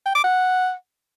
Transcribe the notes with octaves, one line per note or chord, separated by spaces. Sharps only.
G5
D6
F#5